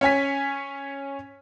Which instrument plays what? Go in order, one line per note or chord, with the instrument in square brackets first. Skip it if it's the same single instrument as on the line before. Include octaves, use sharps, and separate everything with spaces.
[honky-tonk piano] C#4 C#5 G#5 B6